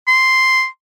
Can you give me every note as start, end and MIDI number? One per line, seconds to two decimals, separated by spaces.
0.08 0.67 84